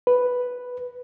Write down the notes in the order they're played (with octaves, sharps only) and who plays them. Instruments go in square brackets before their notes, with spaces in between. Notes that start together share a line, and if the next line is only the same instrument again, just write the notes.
[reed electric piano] B4